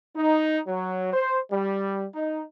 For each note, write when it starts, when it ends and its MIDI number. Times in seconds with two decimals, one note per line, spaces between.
0.17 0.60 63
0.68 1.11 54
1.13 1.37 72
1.52 2.05 55
2.15 2.42 63